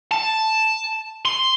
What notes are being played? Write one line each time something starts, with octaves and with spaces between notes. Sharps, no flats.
A5
C6